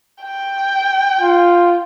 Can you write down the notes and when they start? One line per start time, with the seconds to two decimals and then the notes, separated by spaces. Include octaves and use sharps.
0.22 G5
1.21 F4